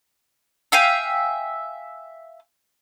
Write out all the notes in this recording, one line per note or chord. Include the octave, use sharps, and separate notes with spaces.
E5 F5 G5 G#5